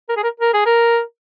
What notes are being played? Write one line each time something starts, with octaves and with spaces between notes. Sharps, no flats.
A#4
G#4
A#4
A#4
G#4
A#4